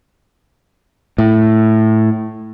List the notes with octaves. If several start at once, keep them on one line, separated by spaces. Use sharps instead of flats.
A2